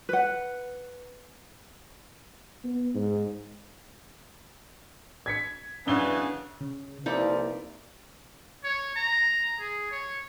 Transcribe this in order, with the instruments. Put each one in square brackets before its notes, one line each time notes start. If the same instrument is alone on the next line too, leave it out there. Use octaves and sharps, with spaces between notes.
[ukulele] B4 F#5
[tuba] B3
G#2
[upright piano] G#6 B6 C#7
[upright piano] F#2 D4 G7 [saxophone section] C#3 E3 B3
[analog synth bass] C#3
[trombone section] C2 F3 B4 [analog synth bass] A#3 [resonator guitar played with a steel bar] D#4 E4 D5
[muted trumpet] C#5
A#5
G#4
C#5